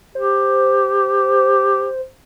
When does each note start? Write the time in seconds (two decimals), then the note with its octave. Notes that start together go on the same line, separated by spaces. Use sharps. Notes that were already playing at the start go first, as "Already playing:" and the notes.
0.15 G4 C5